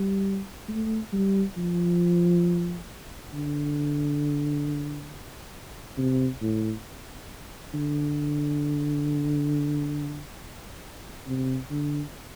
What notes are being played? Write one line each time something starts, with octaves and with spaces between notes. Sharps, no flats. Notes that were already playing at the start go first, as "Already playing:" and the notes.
Already playing: G3
A3
G3
F3
D3
C3
A2
D3
C3
D3